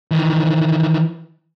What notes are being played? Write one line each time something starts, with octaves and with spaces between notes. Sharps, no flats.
D#3 E3